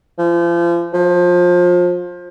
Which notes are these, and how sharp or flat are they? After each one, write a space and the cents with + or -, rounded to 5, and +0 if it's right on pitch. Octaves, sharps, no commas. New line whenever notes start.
F3 -35
F3 +25